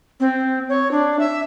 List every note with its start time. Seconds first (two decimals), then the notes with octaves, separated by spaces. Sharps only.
0.20 C4
0.69 C#5
0.91 D4
1.19 E5